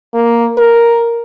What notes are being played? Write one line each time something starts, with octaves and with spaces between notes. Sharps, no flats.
A#3
A#4